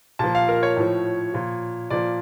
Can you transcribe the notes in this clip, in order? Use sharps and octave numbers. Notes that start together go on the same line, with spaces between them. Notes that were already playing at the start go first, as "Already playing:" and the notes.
A#2 F3 A5
F5
A#4
C#5
A2 F3
A#2 F3
A#2 F3 D5